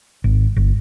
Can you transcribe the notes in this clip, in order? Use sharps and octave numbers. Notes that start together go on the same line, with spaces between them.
G#1
G1